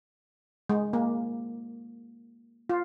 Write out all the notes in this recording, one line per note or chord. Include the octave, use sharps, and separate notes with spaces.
G#3
A#3
F4